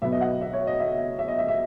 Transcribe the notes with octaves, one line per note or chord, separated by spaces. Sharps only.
B1 B2 F#3 B3 E5
D#5
F#5
E5
C#5
D#5
E5
E5
D#5
E5
E5